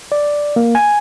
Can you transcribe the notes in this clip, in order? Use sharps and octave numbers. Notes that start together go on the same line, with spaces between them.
D5
A#3
G#5